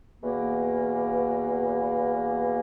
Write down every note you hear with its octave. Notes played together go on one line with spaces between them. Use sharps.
E2 B2 A#3